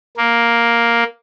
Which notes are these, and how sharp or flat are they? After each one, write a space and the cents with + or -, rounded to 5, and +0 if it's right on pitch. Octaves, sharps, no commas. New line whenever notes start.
A#3 +5